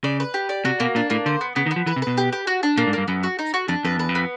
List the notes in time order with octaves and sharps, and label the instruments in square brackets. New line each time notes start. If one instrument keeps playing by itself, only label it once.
[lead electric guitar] C#3 [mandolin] D5
[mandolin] B4
G4
D5
[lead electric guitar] C3 [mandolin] F#4
[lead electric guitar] B2 [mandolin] A#3
[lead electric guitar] A#2 [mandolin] D4
[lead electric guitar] A2 [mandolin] A#3
[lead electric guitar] D3 [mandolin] C5
[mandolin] B3
[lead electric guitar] C#3 [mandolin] B3
[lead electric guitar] D#3
[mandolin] B3
[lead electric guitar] F3
[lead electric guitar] E3 [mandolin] B4
[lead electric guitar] C3
[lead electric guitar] B2 [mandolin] B4
[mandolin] G4
G4
F#4
D4
[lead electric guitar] A#2 [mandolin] A#3
[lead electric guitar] G#2
[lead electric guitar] G2 [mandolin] A#3
[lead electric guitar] F#2 [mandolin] B3
[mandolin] F#4
D#4
F#4
[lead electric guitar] F2 [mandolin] D4
[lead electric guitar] F2 [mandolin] B4
[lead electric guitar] E2 [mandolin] B4
[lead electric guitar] F2
[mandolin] B3